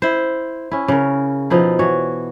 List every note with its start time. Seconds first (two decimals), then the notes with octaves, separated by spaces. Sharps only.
0.02 E4 C5
0.71 C#4 E4
0.88 C#3 A#4
1.50 B2 F3 D#4 E4
1.79 E3 F#4 C#5